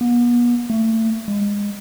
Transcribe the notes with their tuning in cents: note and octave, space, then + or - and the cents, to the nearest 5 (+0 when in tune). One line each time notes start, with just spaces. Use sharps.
B3 -40
A3 +30
G#3 -25